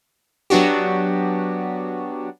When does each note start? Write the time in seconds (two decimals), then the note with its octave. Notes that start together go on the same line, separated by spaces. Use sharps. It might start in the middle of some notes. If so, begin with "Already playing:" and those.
0.50 F#3 B3 D4 F#4 G4